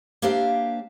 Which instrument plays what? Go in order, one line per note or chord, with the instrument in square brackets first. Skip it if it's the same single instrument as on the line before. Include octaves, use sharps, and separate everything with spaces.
[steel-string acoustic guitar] A#3 D4 G4 C5 E5 F5